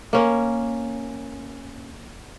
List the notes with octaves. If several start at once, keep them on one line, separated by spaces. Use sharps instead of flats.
A#3 C#4